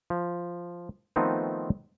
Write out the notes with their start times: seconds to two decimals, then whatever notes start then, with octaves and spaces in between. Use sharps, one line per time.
0.10 F3
1.16 D#3 F3 A3 B3 C4 D#4